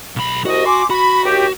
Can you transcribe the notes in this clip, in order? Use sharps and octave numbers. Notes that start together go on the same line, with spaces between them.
B1 B5
C2 F#4 D#5
G#5 C6 D6
F#4 B5
D#2 G4